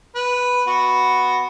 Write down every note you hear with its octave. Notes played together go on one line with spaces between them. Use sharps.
B4
B3 F#4